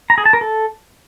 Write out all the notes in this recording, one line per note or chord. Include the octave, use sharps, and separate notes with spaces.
A#5
G#4
A5
A#4
A4